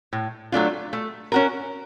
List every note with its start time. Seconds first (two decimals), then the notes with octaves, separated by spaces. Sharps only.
0.13 A2
0.52 F#3 A3 D4 F4
0.93 A3
1.32 C#4 F#4 A#4